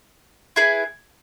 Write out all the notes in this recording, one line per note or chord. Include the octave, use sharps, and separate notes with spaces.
E4 G#4 B4